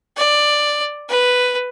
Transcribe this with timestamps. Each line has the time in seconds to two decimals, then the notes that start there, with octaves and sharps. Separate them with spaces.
0.17 D5
1.09 B4